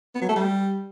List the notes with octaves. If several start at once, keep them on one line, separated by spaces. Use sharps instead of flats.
B3
F#3
A3
G3